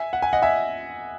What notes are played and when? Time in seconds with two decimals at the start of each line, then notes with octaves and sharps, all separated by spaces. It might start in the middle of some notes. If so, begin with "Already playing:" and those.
Already playing: E5 G#5
0.13 F#5
0.22 G#5
0.33 D#5 F#5
0.42 E5 G#5